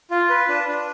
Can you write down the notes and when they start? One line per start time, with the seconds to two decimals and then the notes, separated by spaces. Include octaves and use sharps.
0.11 F4
0.30 B4
0.49 D4
0.68 D4